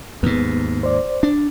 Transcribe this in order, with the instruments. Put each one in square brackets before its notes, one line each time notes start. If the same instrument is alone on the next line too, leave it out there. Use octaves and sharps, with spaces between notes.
[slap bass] D#2 G#2 [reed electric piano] B3
[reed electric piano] C5 D5
[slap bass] D4